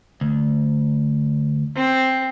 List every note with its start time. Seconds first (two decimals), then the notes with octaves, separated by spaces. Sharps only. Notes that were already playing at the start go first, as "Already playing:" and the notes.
0.21 D2
1.76 C4